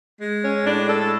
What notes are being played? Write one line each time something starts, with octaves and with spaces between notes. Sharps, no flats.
G#3
C#4
A2 D4
A4